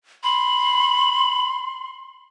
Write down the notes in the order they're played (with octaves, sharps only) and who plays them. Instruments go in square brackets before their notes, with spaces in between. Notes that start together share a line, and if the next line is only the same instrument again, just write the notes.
[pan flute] B5 [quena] C6